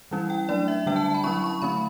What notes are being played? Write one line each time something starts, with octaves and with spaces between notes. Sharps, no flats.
E3 G3 C#4 E4
G5
F#3 A3 D4 D5
E5
D3 G3 D4 G5
A5
A5
B5
F#3 C#4 E4 C#6
C#6
D3 A3 C#4 B5